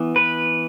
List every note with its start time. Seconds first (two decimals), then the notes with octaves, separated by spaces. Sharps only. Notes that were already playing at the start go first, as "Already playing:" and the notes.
Already playing: E3 B3
0.16 B4